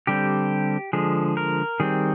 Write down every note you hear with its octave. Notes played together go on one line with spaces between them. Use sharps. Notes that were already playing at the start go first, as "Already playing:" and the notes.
D3 G3 C4 G4
D3 F3 G#3 G#4
A#4
D#3 G3 C4 G#4